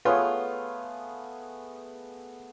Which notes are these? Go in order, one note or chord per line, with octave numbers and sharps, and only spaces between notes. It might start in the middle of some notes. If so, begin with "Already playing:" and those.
A3 B3 F4 G#4 B4 C#5